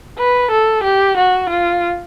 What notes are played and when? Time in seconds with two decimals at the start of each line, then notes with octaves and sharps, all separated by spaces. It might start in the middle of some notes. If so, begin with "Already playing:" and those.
0.18 B4
0.51 A4
0.84 G4
1.17 F#4
1.50 F4